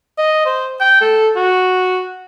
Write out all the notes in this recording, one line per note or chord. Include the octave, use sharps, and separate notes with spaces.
D#5
C5
G5
A4
F#4